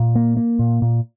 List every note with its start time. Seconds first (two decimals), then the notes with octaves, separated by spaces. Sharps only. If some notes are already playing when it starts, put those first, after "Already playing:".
Already playing: A#2
0.15 A#3
0.37 A#3
0.59 A#2
0.82 A#2